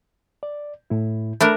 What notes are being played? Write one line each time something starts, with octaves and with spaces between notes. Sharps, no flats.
D5
A2 E4
A3 D4 A#4 B5